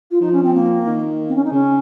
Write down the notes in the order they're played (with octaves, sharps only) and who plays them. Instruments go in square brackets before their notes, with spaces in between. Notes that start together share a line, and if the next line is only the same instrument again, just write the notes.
[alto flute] F4
[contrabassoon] F3 [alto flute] D#4
[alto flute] C#4
C4
A#3
[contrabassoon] D#3
[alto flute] C4
C#4
D#4
[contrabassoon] C#3 [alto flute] C#4